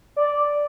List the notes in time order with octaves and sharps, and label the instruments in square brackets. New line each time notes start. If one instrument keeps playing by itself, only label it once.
[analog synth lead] D5